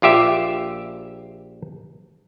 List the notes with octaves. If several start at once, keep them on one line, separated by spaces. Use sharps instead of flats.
A#1 F4 G4 E5